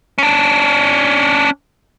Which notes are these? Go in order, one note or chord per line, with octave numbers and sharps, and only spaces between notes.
C#4 D4